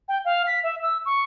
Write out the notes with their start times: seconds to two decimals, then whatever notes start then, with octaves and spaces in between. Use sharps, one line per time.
0.08 G5
0.25 F5
0.47 B6
0.63 E5
0.82 E6
1.05 C#6